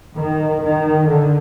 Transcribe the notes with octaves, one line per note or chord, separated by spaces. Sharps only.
D#3
D#3
D3